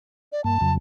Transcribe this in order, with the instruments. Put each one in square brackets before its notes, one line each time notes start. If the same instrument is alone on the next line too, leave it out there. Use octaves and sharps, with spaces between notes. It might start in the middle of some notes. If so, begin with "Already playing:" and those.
[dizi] D5
[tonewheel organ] G2 A#3 [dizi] A5
[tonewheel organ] F2 C#3 F#3